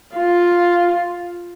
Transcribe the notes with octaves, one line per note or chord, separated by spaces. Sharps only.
F4